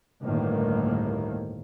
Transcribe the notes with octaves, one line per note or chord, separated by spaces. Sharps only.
G1 D2 A2 D#3 A#3